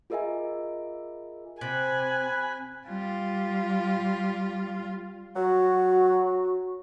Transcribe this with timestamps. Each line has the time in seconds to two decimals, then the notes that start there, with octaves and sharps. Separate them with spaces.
0.10 F4 G#4 A#4 D#5 E5 G#5
1.61 C3 G#5 B5 F#6
2.87 G3 F4
5.36 F#3 F#4